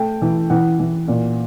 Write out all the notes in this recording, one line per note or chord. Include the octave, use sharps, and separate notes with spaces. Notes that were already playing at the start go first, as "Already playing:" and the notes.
Already playing: A3 G5
E3
E3 F#5
E3
A#2